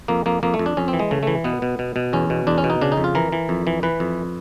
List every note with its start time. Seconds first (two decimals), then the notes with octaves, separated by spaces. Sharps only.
0.08 F2 A#3
0.26 F2 A#3
0.43 F2 A#3
0.54 A3
0.59 F2
0.66 D4
0.77 F2 C#4
0.88 C4
0.93 E3
0.99 G#3
1.11 C#3 A3
1.23 E3 A3
1.44 B2 B3
1.62 B2
1.79 B2
1.96 B2
2.13 E2 C#4
2.30 B2
2.47 E2 D4
2.58 C#4
2.64 B2
2.70 D#4
2.81 C#3 D4
2.92 D#4
2.97 F2
3.04 F4
3.15 E3 A#4
3.32 E3
3.49 F2
3.67 E3
3.83 E3 B4
4.00 F2